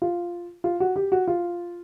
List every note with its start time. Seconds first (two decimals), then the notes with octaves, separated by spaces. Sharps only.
0.02 F4
0.64 F4
0.80 F#4
0.96 G4
1.12 F#4
1.28 F4